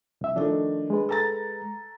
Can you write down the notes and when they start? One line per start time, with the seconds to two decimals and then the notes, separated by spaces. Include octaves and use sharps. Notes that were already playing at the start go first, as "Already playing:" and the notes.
0.21 C2 E5
0.36 D#3 F3 A3 D4
0.90 G#3 B4
1.09 A4 A#5 A6